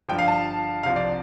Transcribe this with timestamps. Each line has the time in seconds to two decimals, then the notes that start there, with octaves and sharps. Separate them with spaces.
0.09 G1 G2 F3 G5
0.18 F5
0.28 A5
0.83 C2 C3 F3 C4 F5
0.96 D5